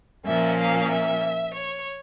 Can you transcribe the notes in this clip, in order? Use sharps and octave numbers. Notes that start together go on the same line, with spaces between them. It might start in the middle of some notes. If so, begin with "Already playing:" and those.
A#2 F3 A#3 C#4 E5
F5
E5
C#5